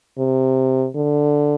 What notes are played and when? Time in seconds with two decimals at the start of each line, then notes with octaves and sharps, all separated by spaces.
0.18 C3
0.95 D3